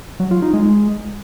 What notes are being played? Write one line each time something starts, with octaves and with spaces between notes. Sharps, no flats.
F#3
F4
D#4
G#3